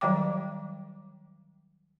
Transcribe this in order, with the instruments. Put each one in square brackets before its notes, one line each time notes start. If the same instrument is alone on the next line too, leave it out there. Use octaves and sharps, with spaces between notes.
[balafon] D#3 F#3 G3 C#5 G5 D6